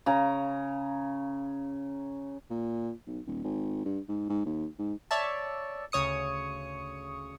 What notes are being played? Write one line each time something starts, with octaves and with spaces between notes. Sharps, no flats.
C#3 A#5
A#2
B1
D#1
G#1
G2
G#2
G#2
D#2
G#2
C#5 D5 E5 A5
D2 C#3 C#5 D#6 C#7